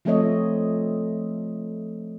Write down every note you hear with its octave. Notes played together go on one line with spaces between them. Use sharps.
F3 A3 C4 A4 C#5 D#5